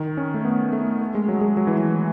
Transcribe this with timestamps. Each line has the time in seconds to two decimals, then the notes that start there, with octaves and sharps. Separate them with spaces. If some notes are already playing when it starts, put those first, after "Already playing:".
Already playing: D#3
0.17 C#4
0.34 A3
0.45 B3
0.73 A3
1.00 A3
1.15 G#3
1.28 F#3
1.41 G#3
1.57 F#3
1.67 E3
1.78 F#3